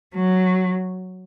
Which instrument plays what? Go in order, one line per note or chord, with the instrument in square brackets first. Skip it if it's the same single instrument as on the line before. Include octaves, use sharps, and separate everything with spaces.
[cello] F#3